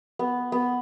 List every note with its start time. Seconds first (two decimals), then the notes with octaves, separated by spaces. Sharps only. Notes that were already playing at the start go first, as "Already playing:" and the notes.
0.19 B3
0.52 B3